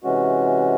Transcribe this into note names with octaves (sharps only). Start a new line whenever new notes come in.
C3 E3 G#3 C#4 F#4